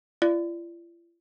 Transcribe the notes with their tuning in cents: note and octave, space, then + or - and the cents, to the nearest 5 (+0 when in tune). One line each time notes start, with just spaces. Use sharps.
F4 -45 D5 +0